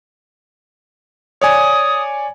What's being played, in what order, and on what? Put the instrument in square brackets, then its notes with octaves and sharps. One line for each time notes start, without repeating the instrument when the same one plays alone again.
[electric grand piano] C#5 D5 G#5 [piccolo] D#6